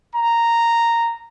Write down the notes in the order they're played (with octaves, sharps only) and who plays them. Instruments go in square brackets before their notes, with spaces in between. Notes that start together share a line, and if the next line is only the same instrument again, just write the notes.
[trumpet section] A#5